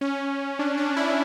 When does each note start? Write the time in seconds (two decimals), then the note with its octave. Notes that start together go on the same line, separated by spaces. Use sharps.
0.01 C#4
0.59 D4
0.78 D4
0.96 E4